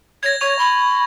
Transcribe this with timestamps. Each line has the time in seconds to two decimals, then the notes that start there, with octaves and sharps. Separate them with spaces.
0.23 C#5 G#6 A#6
0.41 C#5 C#6 G#6 F7
0.58 B5